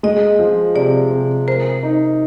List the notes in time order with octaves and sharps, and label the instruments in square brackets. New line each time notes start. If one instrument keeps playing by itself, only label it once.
[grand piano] G#3 [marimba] D#5
[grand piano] F3
[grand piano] C3 [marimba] D5
[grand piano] C3
[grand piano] A#4 [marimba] C5
[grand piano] D#4